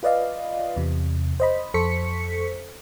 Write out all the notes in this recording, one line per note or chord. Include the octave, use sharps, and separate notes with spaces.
F4 B4 D5 D#5 F5
E2 C3
C5 D#5 B5
F2 A4 C5 C#6 B6 C#7